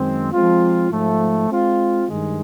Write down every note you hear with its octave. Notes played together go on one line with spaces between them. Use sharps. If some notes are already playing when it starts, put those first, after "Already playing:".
Already playing: F#2 D#3 G#3 C4
F3 G#3 C4 F4
G#2 F3 A3
G#3 C4 F4
G2 D#3 G#3